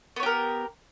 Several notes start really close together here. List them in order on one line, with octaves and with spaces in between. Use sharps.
B3 C#5 G4 A#4